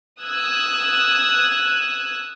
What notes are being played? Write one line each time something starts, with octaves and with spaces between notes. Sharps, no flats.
D#6 E6 F#6 G#6